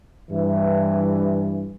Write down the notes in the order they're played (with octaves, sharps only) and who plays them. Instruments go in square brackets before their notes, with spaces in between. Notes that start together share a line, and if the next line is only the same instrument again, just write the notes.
[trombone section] G2 E3